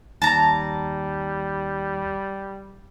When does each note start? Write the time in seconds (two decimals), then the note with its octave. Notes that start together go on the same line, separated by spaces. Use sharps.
0.22 D#2 G3 A5 A#5